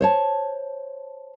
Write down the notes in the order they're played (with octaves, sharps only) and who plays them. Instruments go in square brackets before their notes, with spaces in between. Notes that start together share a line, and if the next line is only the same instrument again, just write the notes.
[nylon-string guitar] C5 C#5 A5